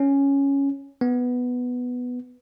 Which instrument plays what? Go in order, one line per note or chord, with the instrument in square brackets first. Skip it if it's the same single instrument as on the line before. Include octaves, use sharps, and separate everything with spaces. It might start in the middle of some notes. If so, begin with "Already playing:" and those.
Already playing: [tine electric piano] C#4
B3